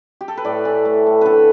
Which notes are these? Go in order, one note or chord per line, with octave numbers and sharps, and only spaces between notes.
G4
A4
B4
A2 D5
E3
A3
A2
D3 A4 B4